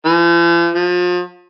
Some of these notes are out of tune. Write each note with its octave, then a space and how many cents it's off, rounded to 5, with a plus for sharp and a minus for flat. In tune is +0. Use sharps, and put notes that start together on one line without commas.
F3 -45
F3 +35